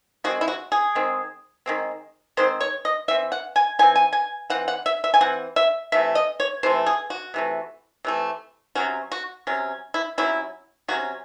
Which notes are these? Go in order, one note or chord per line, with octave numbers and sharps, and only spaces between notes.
D#3 G#3 C4 F#4
E4
F#4
G#4
D#3 G#3 C4
D#3 G#3 C4
D#3 G#3 C4 C5
C#5
D#5
E3 C4 E5
F#5
G#5
E3 C4 G#5
G#5
G#5
E3 C4 F#5
F#5
E5
E5
G#5
E3 C4 F#5
E5
C3 E3 A3 E5
D#5
C#5
C3 E3 A3 C5
G#4
F#4
C3 E3 A3
C3 E3 A3
C3 F#3 C#4 F#4
F#4
C3 F#3 C#4
E4
C3 F#3 C#4 E4
C3 F#3 C#4 F#4